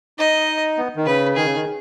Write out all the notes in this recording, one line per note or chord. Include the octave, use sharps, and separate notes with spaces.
D#4 D#5
B3
D#3
C#3 B4
D#3 G#4
C#3
D#3